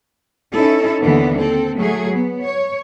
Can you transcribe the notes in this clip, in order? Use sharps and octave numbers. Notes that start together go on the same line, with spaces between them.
C#4 D#4 E4 A4
D#2 D3 E3 B3
C4 A4
F#3 A3 G#4
B3
C#5